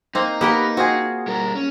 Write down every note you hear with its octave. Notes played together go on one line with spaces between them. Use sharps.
A#3 C4 D#4
A#3 B3 G4 A#4
C4 F4 F#4 G#4
G3 A#4
C#4